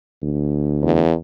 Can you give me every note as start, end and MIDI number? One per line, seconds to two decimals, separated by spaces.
0.22 1.03 38
0.83 1.14 40